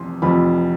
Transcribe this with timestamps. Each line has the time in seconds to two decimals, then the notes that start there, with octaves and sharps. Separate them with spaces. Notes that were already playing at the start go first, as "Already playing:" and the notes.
Already playing: F1 F2 E3 C6
0.22 F1 F2 E3 B5